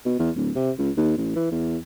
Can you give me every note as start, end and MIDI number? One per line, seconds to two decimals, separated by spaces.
0.06 0.16 47
0.19 0.30 40
0.36 0.50 26
0.55 0.71 48
0.79 0.91 37
0.97 1.12 39
1.17 1.31 33
1.36 1.47 52
1.52 1.77 40